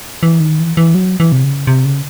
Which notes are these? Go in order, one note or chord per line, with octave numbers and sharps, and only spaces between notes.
E3
D#3
E3
E3
F#3
E3
C3
C#3
C3
C#3